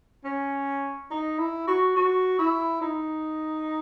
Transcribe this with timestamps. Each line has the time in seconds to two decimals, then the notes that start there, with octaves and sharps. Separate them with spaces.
0.25 C#4
1.11 D#4
1.39 E4
1.67 F#4
1.96 F#4
2.39 E4
2.81 D#4